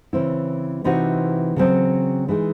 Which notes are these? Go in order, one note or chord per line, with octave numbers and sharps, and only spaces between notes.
C#3 E3 C4 E4
C3 E3 C4 D#4 F#4
C#3 F#3 C4
E3 G#3 D#4 G#4